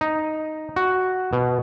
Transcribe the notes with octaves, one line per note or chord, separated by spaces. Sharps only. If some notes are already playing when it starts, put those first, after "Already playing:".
D#4
F#4
B2